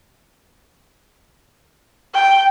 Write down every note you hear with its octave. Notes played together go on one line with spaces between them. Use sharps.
G5